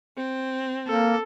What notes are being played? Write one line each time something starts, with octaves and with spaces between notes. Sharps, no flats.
C4
A#3 A4